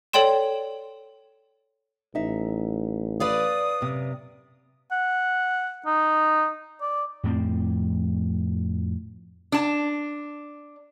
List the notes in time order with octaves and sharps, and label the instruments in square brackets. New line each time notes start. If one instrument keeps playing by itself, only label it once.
[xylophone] A4 C#5 D5 G5 C6 E7
[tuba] A1 [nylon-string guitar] D#4 E5
[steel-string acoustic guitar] B4 D5 F5 [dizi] D#6
[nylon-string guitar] F#2 C3
[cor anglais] F#5
D#4
D5
[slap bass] F2 A2 F3 C4
[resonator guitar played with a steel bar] D4 A5